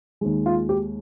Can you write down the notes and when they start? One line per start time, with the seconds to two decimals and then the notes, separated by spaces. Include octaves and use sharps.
0.21 D#2 D#3 G#3
0.46 F4
0.69 G4